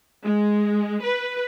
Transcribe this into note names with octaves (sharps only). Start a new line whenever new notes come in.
G#3
B4